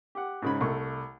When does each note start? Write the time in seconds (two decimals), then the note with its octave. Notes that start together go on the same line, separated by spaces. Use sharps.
0.15 G4 F#5
0.42 G#2 C#3 B5
0.60 C2 A3 C#6